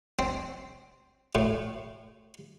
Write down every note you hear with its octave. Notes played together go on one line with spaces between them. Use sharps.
C4
A2